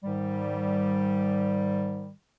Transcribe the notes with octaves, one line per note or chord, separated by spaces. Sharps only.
G#2 D#3 G3